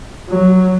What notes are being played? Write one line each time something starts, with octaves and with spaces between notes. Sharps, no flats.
F#3